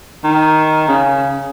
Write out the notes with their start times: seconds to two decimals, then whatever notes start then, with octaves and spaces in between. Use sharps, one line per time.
0.24 D#3
0.88 C#3